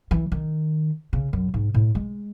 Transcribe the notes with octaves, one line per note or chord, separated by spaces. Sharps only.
E3
D#3
C#3
F#2
G#2
A2
G#3